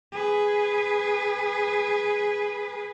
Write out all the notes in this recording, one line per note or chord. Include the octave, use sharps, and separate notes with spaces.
G#4 B4